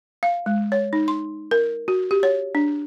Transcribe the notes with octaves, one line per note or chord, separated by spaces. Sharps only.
F5
G#3
C#5
D#4
C6
A#4
F#4
G4
C#5
D4